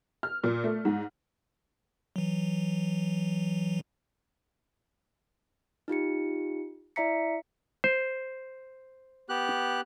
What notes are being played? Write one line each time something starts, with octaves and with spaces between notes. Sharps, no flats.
F6
A#2
A3
G#2
E3 F#3
D#4 F4 G4 C#7
E4 D5 E5 A#5 B6 C#7
C5
B3 G4 F#6